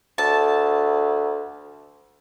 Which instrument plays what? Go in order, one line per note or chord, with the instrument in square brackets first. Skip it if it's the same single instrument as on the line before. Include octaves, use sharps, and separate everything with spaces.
[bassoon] D2 [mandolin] A5